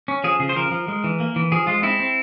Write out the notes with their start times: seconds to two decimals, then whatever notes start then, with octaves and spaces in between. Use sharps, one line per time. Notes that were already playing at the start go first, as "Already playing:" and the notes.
0.08 C#4
0.24 F3 G#4
0.40 C#3 G#4
0.49 C5
0.56 F3 A#4
0.72 F3
0.88 G#3
1.04 E3
1.20 A#3
1.36 E3
1.52 F3 G#4
1.67 G#3 F4
1.83 C4 E4
2.00 C4